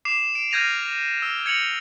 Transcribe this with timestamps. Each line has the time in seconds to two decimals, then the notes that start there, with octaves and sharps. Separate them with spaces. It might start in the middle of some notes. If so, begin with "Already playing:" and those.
0.05 D6 C7 E7
0.35 D7
0.51 F6 G6 G#6 A#6 D#7 F7
1.22 E6
1.46 G#6 C#7 F7 F#7